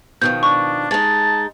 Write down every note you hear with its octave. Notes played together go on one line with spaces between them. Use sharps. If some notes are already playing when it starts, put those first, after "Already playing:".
B2 D#3 F3 G6
D4 C#6
G#3 D#4 A5